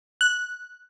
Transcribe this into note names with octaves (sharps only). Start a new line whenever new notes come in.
F#6